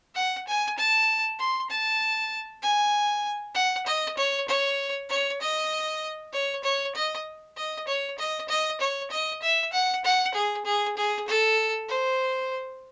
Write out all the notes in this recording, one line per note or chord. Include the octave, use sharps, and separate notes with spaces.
F#5
G#5
A5
C6
A5
G#5
F#5
D#5
C#5
C#5
C#5
D#5
C#5
C#5
D#5
D#5
C#5
D#5
D#5
C#5
D#5
E5
F#5
F#5
G#4
G#4
G#4
A4
C5